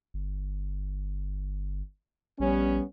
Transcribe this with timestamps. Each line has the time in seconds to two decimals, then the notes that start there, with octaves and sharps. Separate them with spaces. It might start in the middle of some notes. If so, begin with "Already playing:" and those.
0.14 G1
2.40 A#1 G3 B3 C#4